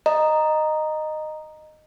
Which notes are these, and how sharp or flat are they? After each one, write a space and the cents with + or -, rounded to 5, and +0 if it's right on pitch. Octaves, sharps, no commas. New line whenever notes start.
D#5 -15 A#5 +0